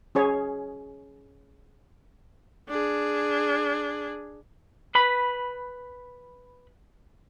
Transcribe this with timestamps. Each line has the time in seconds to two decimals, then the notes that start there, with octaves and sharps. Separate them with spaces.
0.15 C#4 G#4 C#5
2.69 D4 G#4
4.95 B4 B5